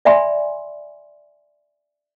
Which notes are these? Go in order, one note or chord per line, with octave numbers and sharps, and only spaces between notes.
D5 E5 G#5 B5 C6